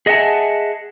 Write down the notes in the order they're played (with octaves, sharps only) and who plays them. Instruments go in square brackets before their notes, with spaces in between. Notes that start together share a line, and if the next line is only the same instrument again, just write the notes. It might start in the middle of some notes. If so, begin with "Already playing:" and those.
[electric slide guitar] G#4 D#5 E5 F#5 G#5 A5